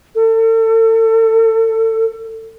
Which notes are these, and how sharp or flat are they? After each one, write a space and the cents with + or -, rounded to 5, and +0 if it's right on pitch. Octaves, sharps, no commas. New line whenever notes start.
A4 +35